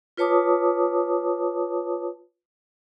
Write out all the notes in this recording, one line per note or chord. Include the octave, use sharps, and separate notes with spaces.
F4 B4 C#5 A5 D6 D#6